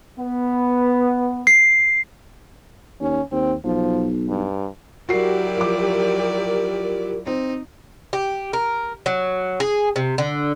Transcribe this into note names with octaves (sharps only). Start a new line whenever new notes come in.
B3
C7
D#2 C#4
D#2 C4
B1 F3
G2
F#3 E4 F#4 G4 A#4 D5 C7
F3 D6
C4 D#4
G4
A#4
F#3
G#4
C3
D3